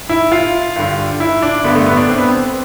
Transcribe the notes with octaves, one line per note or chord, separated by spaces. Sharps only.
E4
F4
G2 D3
E4
D4
G2 D3 B3
A3
B3
D4
C4
B3
C4